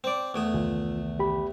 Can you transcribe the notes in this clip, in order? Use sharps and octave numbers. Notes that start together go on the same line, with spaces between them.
C4 D5
E2 A3 D#6
C2 D#3 E3 F4
G4 B5